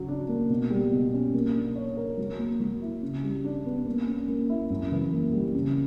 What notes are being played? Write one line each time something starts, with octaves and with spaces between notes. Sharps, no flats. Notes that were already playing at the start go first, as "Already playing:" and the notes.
Already playing: C#3 F#3
D4
A#3
B2
G3
B2
C#4
A#3
D4
C#5
A#4
F#3
A#3
F#3
E4
C#3
G3
D4
B3
A#3
C#4
A#3
E4
F#2
E3
A#3
G3
C#3